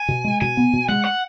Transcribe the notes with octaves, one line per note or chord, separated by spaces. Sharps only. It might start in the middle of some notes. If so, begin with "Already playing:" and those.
Already playing: G#5
B2
G#3
B2 G#5
B3
B2
G#3 F#5
F#5